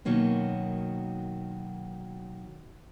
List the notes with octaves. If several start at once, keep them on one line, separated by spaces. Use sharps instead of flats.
B2 D#3 F#3 A#3 C#4